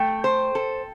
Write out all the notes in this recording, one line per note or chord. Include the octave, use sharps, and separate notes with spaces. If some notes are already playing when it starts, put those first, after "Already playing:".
Already playing: A3 G5
C5
A4